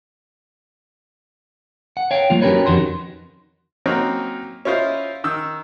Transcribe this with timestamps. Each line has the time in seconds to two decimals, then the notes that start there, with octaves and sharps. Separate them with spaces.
1.97 F#5
2.11 C#5 F5 G5
2.30 F#3 A#3 F4
2.42 C#4 F#4 G4 A#4 B4 C#5
2.66 F2 D#3 F#4 C6
3.86 F#3 A#3 C4 C#4 D#4
4.65 C#4 E4 F4 C5 D#5
5.24 D#3 E6